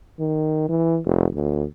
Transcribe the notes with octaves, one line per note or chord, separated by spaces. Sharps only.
D#3
E3
F1
D2